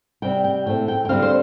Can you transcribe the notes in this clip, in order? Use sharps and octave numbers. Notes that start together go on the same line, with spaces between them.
C3 G3 C4 G5
G5
A2 A3 C4 G5
G5
G5
D3 G3 C4 F5
C5